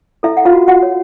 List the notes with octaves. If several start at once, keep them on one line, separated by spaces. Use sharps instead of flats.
E4 A4 E5
F#5
F4 F5
F#4
F#4 F#5
C#5